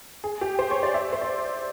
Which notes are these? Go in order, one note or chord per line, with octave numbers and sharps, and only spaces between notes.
G#4
G4
C5
C#5
D5
E5
C5
D5